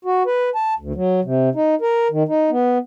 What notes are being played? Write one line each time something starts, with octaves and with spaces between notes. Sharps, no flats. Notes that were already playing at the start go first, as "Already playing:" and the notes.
F#4
B4
A5
D2
F#3
C3
D#4
A#4
D#3
D#4
B3